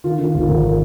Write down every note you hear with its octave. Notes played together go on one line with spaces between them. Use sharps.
D#3 F4
D#3 F4
G#1 F4
G#1 A#4